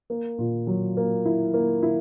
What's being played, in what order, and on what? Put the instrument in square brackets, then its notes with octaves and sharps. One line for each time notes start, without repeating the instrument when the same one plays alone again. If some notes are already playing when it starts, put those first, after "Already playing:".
[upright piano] A#3
A#2
F#3
A#3
E4
A#3
E4